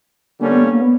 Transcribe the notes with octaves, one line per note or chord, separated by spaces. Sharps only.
D3 G3 A#3 C#4
B3
A#3
A#3
B3